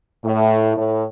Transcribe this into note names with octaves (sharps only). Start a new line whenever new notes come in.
A2
A2